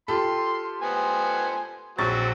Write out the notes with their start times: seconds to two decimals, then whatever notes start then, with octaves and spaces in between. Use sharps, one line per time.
0.08 F4 G4 A4 C6
0.82 B3 C5 G#5
1.99 A#1 F#3 C4 C#6 A6